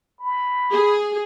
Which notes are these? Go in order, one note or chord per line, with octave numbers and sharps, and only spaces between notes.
B5
G#4